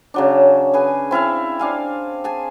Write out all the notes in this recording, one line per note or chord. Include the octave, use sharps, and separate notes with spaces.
C#3 F#3 D4
G#4 B4 G#5
C4 E4 F5 A5
D4 F5 G#5
G#4 G#5 A5